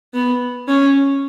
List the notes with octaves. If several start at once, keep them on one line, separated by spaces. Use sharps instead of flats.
B3
C#4